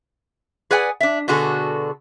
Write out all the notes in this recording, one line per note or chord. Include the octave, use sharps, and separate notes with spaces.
G#4 B4 D5 F#5 G#5
D4 E5
B2 D3 F#4 G#4 A4